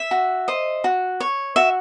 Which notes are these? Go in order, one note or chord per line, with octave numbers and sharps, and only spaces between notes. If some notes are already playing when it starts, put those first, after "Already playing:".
Already playing: E5
F#4
C5 D#5
F#4
C#5
F#4 E5